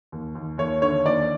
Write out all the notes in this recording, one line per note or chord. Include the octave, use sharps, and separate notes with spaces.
D#2
D#2
D#2 C#5
D3 C#5
D#2 D5